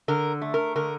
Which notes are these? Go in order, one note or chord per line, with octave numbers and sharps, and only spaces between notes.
D3 A#4
A3
A#4
D3 A#4